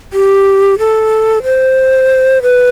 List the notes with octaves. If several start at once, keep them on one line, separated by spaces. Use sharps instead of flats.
G4
A4
C5
B4